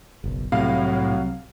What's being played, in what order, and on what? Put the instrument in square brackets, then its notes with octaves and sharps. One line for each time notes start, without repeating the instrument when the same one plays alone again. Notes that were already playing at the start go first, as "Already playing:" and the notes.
[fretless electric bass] F#1 B1
[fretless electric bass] C2 C3 [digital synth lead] A2 [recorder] F#3 [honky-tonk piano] F5